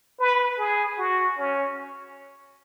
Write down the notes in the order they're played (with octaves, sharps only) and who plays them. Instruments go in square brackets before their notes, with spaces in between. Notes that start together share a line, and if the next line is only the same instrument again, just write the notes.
[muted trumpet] B4
G#4
F#4
C#4